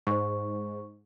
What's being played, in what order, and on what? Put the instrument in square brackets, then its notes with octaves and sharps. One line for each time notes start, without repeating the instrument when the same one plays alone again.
[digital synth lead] G#2 [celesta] C5 C#6